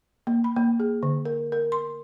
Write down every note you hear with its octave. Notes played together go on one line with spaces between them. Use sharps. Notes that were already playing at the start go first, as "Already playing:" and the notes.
A#3
B5
A#3
G#4
D3
A#4
A#4
C6